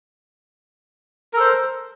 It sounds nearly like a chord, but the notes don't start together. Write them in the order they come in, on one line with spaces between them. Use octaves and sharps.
A#4 A4 C5